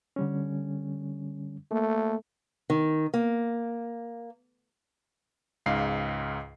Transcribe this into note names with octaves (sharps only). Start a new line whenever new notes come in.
D3 G3 C#4
A3 A#3
D#3
A#3
C#2 G#2 F5 C7